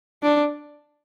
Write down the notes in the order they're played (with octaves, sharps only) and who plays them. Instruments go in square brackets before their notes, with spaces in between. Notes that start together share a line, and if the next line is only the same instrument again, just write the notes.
[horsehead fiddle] D4